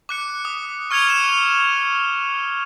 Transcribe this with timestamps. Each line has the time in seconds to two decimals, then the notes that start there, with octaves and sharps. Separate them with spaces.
0.09 D6 F#6 C#7
0.45 D#6
0.91 C#6 F6 G#6 C#7 F7 G7
1.07 C#7 E7 F7